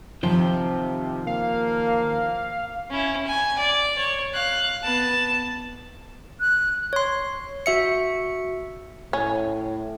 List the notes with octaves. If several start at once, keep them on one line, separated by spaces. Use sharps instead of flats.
C3 D#3 F3 G5
A#3 F5
C#4 E4
G#5
D5
C#5
F5 F#6
B3 A5
F#6
C#5 C6
F#4 E5 C#7
A2 C#4